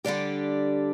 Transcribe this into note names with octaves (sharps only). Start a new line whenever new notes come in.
D3 G3 D4 G4